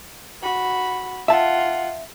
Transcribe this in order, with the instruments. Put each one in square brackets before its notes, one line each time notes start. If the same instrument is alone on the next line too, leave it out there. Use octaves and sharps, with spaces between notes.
[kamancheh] F#4 B5
[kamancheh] F4 F#5 [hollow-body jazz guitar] E5 A5